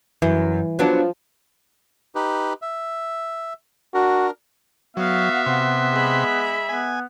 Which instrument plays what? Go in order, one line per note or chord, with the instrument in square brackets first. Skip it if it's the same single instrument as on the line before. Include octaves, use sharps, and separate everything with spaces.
[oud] F#2 [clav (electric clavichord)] E3
[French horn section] F3 [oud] F#3 B3 D4
[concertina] D#4 G4 B4
E5
[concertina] D4 A#4 [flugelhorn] F#4
[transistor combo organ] F#3 [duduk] B3 [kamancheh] F#4 F5 [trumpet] E5
[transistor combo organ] C3 C6
[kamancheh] G#3 B5
[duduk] B3 [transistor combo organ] G#5